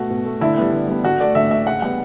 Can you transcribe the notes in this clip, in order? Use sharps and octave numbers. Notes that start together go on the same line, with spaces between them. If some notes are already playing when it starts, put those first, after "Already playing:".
Already playing: B2 A3 F#4
B2
A3
D3 E4
G3 B3
D3
G3 B3
D3 F#4
A3 D5
D3 E5
A3 E5
C#3 F#5
G3 B3 F#5